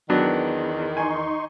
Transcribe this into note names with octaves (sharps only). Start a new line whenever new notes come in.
E2 D#3 F#3 B3 D4
D#4 G#5 C6 C#6